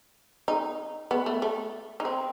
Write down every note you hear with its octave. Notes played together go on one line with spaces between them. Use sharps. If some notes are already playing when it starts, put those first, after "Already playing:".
D#4
B3
A3
A3
D#4
C4